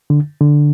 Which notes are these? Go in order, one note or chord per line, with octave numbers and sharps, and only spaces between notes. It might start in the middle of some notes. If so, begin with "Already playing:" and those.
D3
D3